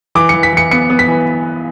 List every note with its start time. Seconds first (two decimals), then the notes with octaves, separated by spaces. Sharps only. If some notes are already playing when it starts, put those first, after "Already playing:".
0.15 E3 D6
0.29 E3 C#7
0.43 B6
0.53 E3 C#7
0.71 B3 C#7
0.90 B3
0.99 B6
1.08 E3